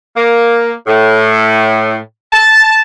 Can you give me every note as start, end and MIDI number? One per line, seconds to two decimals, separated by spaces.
0.16 0.71 58
0.87 1.95 45
2.32 2.78 81